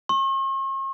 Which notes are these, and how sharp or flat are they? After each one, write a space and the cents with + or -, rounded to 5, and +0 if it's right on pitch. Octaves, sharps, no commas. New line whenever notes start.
C#6 -45